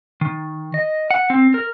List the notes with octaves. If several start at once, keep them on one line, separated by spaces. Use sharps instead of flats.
D#3
D#5
F#5
C4
A#4